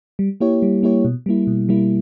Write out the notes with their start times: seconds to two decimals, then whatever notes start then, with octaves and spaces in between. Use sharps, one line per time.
0.19 G3
0.40 A#3 E4 G4 C#5
0.62 G3
0.83 A#3 E4 G4 C#5
1.05 B2
1.26 G3 A#3 E4
1.47 B2
1.69 G3 A#3 E4